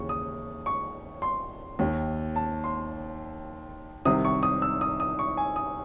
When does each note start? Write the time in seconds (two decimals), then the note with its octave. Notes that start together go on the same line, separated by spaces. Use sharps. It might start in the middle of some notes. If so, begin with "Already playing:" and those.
Already playing: D#2 C#3 E3 C#6
0.09 D#6
0.66 C#6
1.22 C6
1.79 D#2 D#3
2.36 A5
2.64 C6
4.05 C2 C3 D#3 D#6
4.25 C#6
4.43 D#6
4.62 E6
4.81 D#6
5.00 D#6
5.19 C#6
5.37 G#5
5.56 D#6